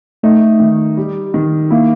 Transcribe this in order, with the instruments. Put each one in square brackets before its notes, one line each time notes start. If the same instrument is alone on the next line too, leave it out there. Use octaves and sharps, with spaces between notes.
[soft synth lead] A3 [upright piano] D#4
[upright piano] D#3
G3
D#3
[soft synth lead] A#3 [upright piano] E4